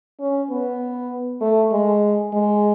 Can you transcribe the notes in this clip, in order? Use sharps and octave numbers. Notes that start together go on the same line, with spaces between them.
C#4
B3
A3
G#3
G#3